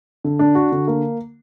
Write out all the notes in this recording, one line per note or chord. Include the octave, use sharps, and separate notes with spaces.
D3
D4
F#4
D3
A#3